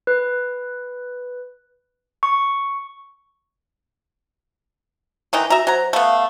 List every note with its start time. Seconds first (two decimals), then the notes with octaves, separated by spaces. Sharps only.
0.07 B4
2.23 C#6
5.33 D#3 E3 D#4
5.50 F#4 E5 A#5
5.67 F#3 C5 A#5
5.93 A3 B3 F5